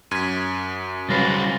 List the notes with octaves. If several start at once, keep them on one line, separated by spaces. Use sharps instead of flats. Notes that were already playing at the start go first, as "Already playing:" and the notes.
F#2 G#6 B6 D#7
C2 F#3 G#3 F4 B4 A6 A#6 C7